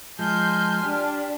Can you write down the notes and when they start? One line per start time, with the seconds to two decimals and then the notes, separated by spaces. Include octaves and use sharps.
0.19 F3 G#3 G#5 A5 C6 F6 G6
0.84 D4 G4